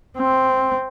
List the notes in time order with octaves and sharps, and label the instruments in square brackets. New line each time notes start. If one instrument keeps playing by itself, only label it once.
[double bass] C4